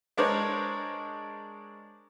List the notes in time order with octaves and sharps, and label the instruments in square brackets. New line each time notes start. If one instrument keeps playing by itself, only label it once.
[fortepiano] G#3 D4 A#4 C5 C#5